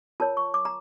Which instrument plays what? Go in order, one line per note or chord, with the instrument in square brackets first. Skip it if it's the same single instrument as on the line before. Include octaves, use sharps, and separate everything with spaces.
[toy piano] F4 A#4 C#5 A5
C#6
D6
A#5